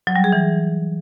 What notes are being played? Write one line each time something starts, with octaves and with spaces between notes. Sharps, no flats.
F#3
G3
G#4
E3